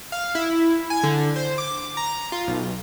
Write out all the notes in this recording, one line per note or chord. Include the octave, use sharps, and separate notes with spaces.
F5
E4
G#5
D3
C5
D6
A#5
F4
B1